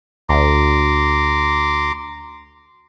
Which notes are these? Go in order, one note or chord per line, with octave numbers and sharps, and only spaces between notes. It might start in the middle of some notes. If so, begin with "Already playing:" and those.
D2 A#5 C6 D6